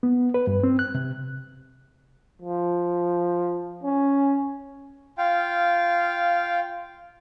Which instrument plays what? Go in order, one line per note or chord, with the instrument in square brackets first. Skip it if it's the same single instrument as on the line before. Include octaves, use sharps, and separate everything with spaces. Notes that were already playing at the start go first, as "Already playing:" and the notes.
[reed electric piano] B3
B4
G2
C4
F#6
C3
[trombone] F3
C#4
[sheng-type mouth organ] F4 F5 G5